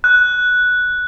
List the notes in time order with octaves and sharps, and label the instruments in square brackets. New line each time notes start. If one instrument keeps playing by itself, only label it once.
[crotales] F#6